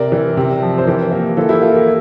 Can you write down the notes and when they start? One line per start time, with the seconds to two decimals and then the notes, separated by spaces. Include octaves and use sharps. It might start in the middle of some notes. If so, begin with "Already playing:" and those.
Already playing: C3 A#4 D5
0.12 E3
0.37 C3
0.62 F3
0.78 C5
0.87 E3 G4 A#4
1.12 A#3
1.37 E3 F4 A4
1.49 E4 G4
1.61 A#3 F4 A4
1.74 G4 A#4